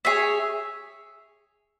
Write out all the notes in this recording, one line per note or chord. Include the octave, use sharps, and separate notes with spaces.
G#4 C#5 E5